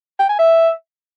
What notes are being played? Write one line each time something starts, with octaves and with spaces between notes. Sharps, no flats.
G5
G#5
E5